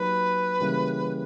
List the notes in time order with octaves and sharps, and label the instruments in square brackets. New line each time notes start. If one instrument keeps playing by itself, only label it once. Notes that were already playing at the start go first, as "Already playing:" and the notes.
Already playing: [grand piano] F#3 A#3 D#4 G4 [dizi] B4
[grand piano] C#3 E3 G3 A#3 C#4